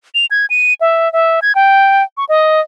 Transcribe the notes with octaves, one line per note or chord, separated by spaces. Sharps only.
F7
G#6
D#7
E5
E5
G#6
G5
C#6
D#5